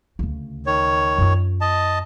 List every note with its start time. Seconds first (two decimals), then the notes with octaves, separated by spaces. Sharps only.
0.19 D2 C#3
0.66 D#3 C#5
1.18 F#2 F4
1.61 D#5 A5